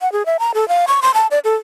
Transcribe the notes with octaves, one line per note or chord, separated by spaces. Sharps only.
F#5
G#4
E5
A#5
A4
F5
C#6
C6
A5
D5
A4